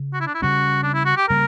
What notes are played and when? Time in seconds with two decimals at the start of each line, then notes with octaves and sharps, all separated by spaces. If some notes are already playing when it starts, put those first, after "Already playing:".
Already playing: C#3
0.14 F#4
0.21 E4
0.27 D4
0.35 E4
0.42 C#3 G3 C#4 F#4
0.83 D4
0.94 E4
1.06 F#4
1.17 G4
1.29 C#3 G3 A#3 A#4